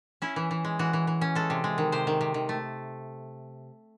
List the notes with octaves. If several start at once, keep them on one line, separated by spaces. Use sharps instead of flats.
C#4 E4
E3
E3
G#3
E3 F#4
E3
E3
C#4
G#3 A4
C3
G#3
D#3
C3 C5
D#3
C3
D#3
A3